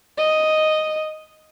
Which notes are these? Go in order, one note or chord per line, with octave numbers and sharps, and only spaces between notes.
D#5